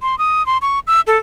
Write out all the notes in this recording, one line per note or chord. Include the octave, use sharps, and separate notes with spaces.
C6
D#6
C6
C#6
E6
A4